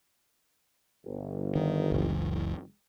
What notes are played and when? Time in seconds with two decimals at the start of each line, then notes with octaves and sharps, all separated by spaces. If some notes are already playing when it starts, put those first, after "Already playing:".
1.06 G1
1.56 D#3
1.92 F#1 C#2 E3